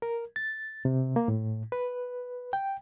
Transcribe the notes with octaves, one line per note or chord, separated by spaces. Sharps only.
A#4
A6
C3
A#3
A2
B4
G5